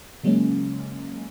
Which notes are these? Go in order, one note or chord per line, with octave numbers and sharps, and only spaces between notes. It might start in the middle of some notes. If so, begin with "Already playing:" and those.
C#3 F#3 G#3 A#3 C#4